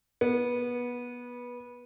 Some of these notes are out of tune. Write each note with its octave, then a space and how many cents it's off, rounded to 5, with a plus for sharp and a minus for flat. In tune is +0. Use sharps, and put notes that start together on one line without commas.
B3 -20